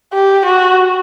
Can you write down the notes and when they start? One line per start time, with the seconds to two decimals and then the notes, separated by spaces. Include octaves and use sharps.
0.13 G4
0.46 F#4